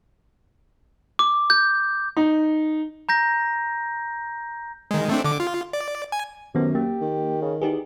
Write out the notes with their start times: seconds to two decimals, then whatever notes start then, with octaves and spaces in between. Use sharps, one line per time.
1.19 D6
1.50 G6
2.17 D#4
3.09 A#5 G6 A#6
4.91 D#3 G#3
5.09 A3 C4 D4
5.24 D3 D6
5.40 F4
5.73 D5
6.12 G#5
6.55 F#2 C3 D#3 B3
6.75 A#3 G4
7.01 D#3
7.42 C#3
7.62 E2 D#4 G4 G#4